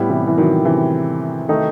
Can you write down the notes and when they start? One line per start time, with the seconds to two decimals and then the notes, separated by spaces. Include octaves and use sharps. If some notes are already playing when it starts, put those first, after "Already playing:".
Already playing: A2 G3 B3 E4
0.09 C3 E3
0.27 E3
0.38 D#3 F#3
0.65 C3 E3
1.49 D#3 A3 D#4